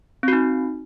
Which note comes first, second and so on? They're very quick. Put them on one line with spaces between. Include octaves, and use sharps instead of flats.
C4 F#4 D#4